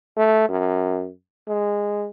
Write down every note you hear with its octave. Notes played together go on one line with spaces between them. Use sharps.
A3
F#2
G#3